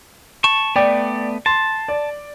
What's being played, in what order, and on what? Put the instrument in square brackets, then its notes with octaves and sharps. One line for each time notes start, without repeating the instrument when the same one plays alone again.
[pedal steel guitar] A5 C#6
[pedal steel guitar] A3 B3 [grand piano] D5 G5
[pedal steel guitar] A5 [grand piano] C6
[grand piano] D5